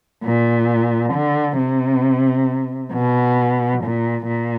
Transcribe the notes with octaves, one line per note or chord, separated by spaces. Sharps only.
A#2
D3
C3
B2
A#2
A#2